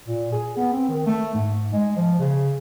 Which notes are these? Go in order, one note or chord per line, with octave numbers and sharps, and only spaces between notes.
A#2
G#4
B3
C4
D#3
A3
G#2
G#3
F3
C#3